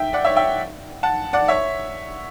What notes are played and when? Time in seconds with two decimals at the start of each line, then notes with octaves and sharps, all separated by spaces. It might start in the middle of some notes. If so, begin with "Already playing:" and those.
Already playing: E5 G5
0.13 D5 F#5
0.25 C#5 E5
0.36 E5 G5
1.03 F#5 A5
1.33 D5 F#5
1.48 C#5 E5